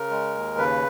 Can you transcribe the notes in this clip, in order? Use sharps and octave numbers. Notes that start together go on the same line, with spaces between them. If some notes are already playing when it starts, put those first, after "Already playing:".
Already playing: C#3 A#4
G#3
D#2
C#3 B4